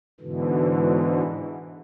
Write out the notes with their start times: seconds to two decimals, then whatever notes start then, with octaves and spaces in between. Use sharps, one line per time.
0.21 G#2 B2 D3 E3